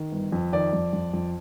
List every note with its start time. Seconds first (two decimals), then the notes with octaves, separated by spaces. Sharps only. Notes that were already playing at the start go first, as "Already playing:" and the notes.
Already playing: D#3
0.12 G1
0.32 F2
0.52 D#3 D5
0.73 F2
0.93 F2
1.13 F2